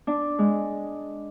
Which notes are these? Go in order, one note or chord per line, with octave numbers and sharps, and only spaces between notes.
D4
G#3